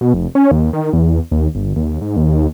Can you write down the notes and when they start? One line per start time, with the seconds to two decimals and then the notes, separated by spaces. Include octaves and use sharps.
0.01 B2
0.14 F1
0.35 C#4
0.51 D#2
0.73 D#3
0.93 E2
1.31 D#2
1.55 G1
1.76 D#2
2.01 G#2
2.17 D#2